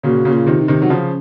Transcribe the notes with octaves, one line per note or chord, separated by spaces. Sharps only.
A#2 C#3 F#4
A#2 C#3
F4
C3 D#3
D#4
C3 D#3
F#3
C#3 F3 C#4